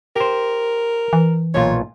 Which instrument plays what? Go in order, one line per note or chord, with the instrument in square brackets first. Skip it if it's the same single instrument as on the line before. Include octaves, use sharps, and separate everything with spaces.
[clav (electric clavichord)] G4 C5 [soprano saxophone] A#4
[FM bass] E3
[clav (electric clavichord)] B1 A#2 F4 [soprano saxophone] C#5